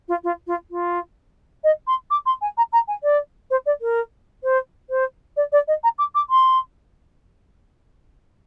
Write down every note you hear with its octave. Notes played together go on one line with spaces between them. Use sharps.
F4
F4
F4
F4
D#5
C6
D6
C6
G#5
A#5
A#5
G#5
D5
C5
D5
A#4
C5
C5
D5
D5
D#5
A#5
D6
D6
C6